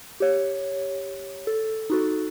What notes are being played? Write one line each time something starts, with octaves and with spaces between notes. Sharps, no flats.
G4 C#5
A4
D#4 F#4 A4